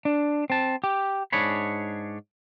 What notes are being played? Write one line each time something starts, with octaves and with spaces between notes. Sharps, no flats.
D4
C4 A5
G4
G#2 D4 G#4 C#5 B5